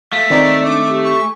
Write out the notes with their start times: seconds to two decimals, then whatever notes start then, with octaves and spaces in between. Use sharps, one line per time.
0.13 A3 F5 B6
0.30 D#3 C4 D#4 D5
0.64 D4 D6
0.89 G4
1.04 C#6
1.20 G#5